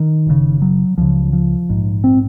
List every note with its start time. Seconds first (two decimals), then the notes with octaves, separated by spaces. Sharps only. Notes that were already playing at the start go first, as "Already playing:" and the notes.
Already playing: D#3
0.26 F#1 F2 C#3
0.62 F#3
0.98 C#2 C#3 F3
1.33 F3
1.69 A#1 G#2
2.04 C4